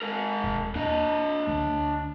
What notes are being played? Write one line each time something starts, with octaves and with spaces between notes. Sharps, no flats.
G#3 A#4
D#1
A#3 D4 D#5
D2 A3